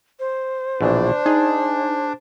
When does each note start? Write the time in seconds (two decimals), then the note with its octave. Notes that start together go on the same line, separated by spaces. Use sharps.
0.20 C5
0.81 A#1 B2 E3 D4
1.26 D#4 G#4